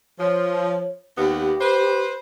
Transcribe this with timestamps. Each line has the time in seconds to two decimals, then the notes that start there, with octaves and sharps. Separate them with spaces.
0.20 F3 C#5
1.18 D#2 B3 G4
1.61 B4 C5